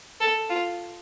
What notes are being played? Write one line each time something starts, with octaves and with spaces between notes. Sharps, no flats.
A4
F4